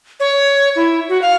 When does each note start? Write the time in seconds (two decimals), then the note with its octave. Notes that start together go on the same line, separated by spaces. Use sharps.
0.20 C#5
0.76 E4
1.09 F#4
1.22 F5